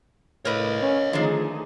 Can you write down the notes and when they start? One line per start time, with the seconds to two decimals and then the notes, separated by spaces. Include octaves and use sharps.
0.45 A2 A#4 B4 C#5 D#5
0.82 C#4
1.13 D3 D#3 F3 A3 D#4 G#4